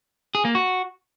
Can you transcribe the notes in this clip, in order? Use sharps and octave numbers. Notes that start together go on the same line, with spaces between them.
G#4
A#3
F#4